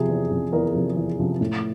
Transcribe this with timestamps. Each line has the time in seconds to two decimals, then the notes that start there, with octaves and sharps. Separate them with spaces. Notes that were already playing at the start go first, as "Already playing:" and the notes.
Already playing: C3 F3 G#4
0.09 E2
0.30 C3 F3
0.53 E2 A#4
0.74 C3 F3
0.96 E2
1.19 C3 F3
1.41 A2